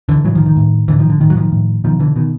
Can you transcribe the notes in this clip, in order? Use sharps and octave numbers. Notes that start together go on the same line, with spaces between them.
D3 E3
A2 E3 F#3
D#3 F3
D#3
A2
A2 D3 E3
D#3 F3
D3
A2 D#3
F#3
D#3 F3
A2
B2 D#3 F3
D3 E3
B2 D#3